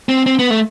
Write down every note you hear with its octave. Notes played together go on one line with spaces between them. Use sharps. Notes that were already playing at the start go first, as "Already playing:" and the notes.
C4
C4
B3
A3